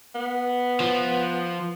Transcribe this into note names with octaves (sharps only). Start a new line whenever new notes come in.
B3
F3